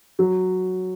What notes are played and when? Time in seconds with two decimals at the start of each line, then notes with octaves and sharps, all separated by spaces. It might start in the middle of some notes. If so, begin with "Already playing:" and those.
0.19 F#3